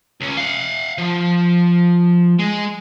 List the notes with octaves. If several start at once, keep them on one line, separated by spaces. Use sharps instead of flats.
C#2 C#4
F5 F#5
F3
G#3